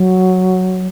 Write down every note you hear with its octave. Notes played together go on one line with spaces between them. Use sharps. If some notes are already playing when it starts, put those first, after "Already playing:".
Already playing: F#3